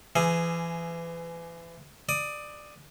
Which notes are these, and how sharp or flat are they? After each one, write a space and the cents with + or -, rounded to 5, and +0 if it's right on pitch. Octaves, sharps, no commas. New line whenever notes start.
E3 +30 G#4 +0
D5 +15 D#6 +15